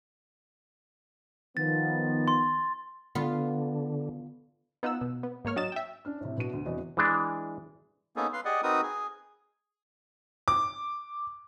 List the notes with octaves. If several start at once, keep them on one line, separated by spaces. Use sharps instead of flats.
D#3 F3 B3 A6
C6
D3 B3 F4
B3 D#4 F4 F#5 E6
B2
B3
G#2 A#3 C#5 F6
F#3 D4 D#5 A6 E7
E5 G5
C#4 D4 F6
A2 C3
B2 D4 F#4 D#7
D2
E1 E2 C3 F#4 D#5
E3 G#3 D4
A#3 B3 C#4 D#4 G#4 A4
B4 F5 C6
G4 G#4 D5 D#5 F#5
C4 D#4 F#4 A#4 B4 D#6
G#4
D6